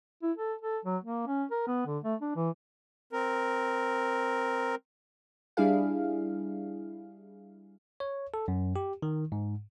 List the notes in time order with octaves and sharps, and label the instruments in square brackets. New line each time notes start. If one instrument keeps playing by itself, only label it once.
[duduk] E4
A4
A4
F#3
A#3
C#4
A#4
B3
D3
A3
D4
E3
[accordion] C4 A#4
[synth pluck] G3 D4 E4 G#4 F5
[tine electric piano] C#5
A4
F#2
G4
D#3
G#2